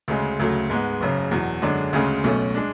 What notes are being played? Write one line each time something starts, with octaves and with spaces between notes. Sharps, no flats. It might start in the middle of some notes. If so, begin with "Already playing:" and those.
D2 C#3 G#3
D2 C#3 F#3 A3
G#2 G#3 B3
F#1 F#2 C#3
E2 B2 F#3
F#2 D3 G#3 D4
D2 C#3 G#3 C#4 G#4
B1 B2 A3 C#4
G#3 D4